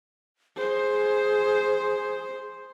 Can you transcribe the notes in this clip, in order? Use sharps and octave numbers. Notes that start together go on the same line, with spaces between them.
G#4 C5